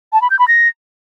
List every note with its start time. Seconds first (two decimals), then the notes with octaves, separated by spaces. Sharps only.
0.13 A5
0.22 B5
0.30 G6
0.39 B5
0.48 A#6